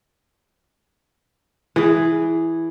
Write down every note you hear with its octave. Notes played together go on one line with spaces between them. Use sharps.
E3 G#4